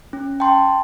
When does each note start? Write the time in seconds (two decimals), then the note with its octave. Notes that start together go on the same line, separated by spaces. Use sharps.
0.13 C#4
0.40 G5 A5 C6